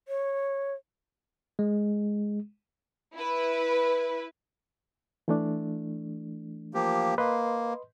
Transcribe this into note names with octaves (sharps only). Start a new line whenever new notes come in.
C#5
G#3
E4 B4
E3 A3 D4
F3 A#3 G4
A#3 B4 D#5 C6